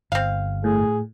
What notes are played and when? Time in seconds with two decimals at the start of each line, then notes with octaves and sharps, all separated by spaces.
0.12 G1 C4 F5
0.64 A2 G#4